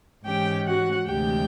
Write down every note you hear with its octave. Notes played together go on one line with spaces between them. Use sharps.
G#2 E3 G#3 C#4 G4 G5
F#4 F#5
D2 C3 E3 G#3 G4 G5